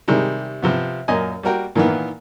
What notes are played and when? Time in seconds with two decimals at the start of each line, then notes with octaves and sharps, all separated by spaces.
0.08 C3 D#3 G3 G#3
0.62 C3 F3 B3
1.08 F#2 A#2 D#5 G#5
1.43 G3 A#3 F#4 A#4 G5
1.76 A#2 D#3 E3 A#3 B3